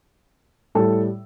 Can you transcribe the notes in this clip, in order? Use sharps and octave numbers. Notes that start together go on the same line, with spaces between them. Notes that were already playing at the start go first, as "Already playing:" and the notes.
A2 G3 A4